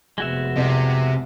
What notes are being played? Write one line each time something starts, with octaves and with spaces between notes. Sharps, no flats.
F1 G#3 B3 F#4 E5
C2 C3 D#5